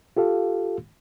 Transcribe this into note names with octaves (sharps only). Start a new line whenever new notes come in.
F4 G4 A4 F5